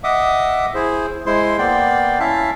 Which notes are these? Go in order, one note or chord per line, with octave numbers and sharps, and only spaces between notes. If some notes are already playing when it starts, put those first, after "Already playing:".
D#5 E5 F#5 D6 D#6
E4 G#4 C5
G#3 E4 C5 C6
A#3 B3 D5 G5 C6
C#4 E4 E5 F5 A5